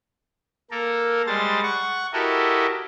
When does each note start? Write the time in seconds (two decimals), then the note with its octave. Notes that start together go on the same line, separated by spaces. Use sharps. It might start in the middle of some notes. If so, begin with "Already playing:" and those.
0.71 A#3 A4 A#4
1.27 G3 G#3 C5 A6
1.63 F#5 C#6
2.13 E4 F#4 G4 A4 A#4 D#5